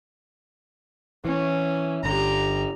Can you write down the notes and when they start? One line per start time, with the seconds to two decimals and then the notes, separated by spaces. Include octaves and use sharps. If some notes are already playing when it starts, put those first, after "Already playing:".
1.25 E3 C#4
2.04 G1 D3 G4 A#5